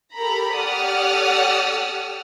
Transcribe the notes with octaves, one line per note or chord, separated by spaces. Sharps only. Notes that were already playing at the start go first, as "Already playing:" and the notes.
G4 A4 A#4 A#5 B5
G4 A4 D5 F#5 D#6 F6